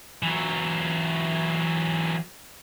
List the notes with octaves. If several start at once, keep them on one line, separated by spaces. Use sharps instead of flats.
E3 F#3